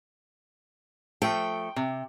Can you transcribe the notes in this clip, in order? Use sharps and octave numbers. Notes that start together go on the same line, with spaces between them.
F3 A3 A4 G5
C3